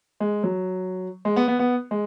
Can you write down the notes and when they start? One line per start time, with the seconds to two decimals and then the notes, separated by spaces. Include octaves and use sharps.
0.20 G#3
0.43 F#3
1.25 G#3
1.36 B3
1.48 B3
1.59 B3
1.91 G#3